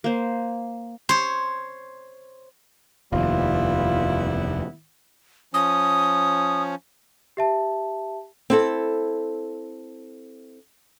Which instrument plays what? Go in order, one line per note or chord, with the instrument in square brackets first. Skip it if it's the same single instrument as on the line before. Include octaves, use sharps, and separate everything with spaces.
[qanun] A#3 C5
[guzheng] C5 C#5
[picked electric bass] F1 D#2 [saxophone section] G3 B3 E4 [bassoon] F4
[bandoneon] F3 C#4 [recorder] D#6
[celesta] G4 E5 A5
[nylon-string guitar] C4 E4 A4